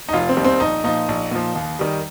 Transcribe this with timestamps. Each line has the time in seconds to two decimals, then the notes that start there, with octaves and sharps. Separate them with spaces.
0.09 D#4
0.13 F1 F4
0.29 C4
0.37 D#2 D#3 G3
0.44 C4
0.60 A#1 D#4
0.84 A#2 F3 D#4
1.08 A#1
1.31 A#2 F3
1.55 D#2
1.79 D#3 G3